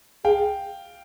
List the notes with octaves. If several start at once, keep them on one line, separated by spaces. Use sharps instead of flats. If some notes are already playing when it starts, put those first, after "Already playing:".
G#4 F5 G5